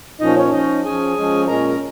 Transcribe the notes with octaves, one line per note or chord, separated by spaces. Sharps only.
A#2 F3 C#4 D#4 D#5
C#4 C#5
F3 C#4 D#4 D#5
F3 C#4 G#4 G#5
F3 G#3 C#4
A#2 G#3 C#4 A#4 A#5
A#5